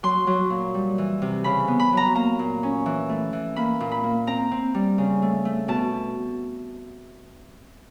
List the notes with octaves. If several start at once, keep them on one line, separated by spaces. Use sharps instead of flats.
F#3 C6
F#3
A#2
G3
E3
C3
C#3 B5
B3
B5
F#3 A#5
A#3 A#5
A#2
C#4
E3
A3
E3
A#3 B5
A#2
B5
A#3
C4 A#5
C4
G3
C#3
A3
A3
B2 A5